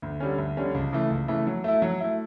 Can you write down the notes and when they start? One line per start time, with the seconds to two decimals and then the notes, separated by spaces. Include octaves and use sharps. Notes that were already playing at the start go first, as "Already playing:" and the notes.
0.02 D2
0.20 D3 G3 C#4
0.38 D2
0.57 D3 G3 C#4
0.74 C#2
0.92 C#3 E3 A3
1.10 C#2
1.28 C#3 E3 A3
1.47 F#3
1.64 A3 E4
1.82 F#3
2.00 A3 E4